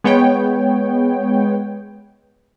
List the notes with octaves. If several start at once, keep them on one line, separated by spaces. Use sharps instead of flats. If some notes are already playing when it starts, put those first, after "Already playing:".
G#3 B3 C#5 G5